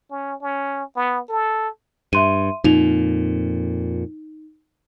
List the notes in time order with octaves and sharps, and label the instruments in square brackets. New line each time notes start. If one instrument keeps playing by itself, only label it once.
[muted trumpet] C#4
C#4
B3
A4
[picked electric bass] G2 [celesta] E5 C6 D#7
[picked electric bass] F2 A#2 [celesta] D#4 F7